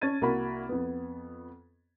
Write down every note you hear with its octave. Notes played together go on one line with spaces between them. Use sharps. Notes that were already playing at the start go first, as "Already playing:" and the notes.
C#4 A5 G#6 A6 D#7
C2 A#3 F#4 B5
F2 B3